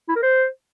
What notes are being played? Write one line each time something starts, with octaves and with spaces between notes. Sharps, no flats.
E4
A#4
C5